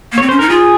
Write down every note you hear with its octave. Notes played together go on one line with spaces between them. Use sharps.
A#3
C4 C#5
C#4 C5
D#4 A#4
F4 G#4